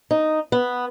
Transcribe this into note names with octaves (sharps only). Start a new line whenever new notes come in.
D#4
B3